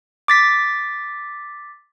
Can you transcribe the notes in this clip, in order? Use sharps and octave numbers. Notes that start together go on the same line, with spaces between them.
D6 A6 B6